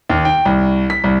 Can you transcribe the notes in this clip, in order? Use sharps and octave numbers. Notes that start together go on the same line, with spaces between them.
D#2
G5
C2
B6
C2